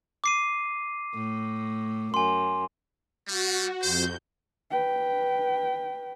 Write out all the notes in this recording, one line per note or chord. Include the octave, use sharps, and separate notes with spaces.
D6 C7 D#7
A2
F#2 G#5 C6
G3 F#4
F2 C5 G6
B4 G5